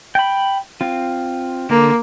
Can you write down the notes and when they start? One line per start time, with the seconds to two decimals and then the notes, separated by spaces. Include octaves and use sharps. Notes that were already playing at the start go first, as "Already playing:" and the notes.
0.15 G5 B5
0.81 C4 F4
1.70 D3 A#3